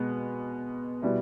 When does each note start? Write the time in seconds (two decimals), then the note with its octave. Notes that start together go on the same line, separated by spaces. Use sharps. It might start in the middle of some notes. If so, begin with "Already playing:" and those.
Already playing: B2 G#3 B3
1.02 B2 G3 B3 E4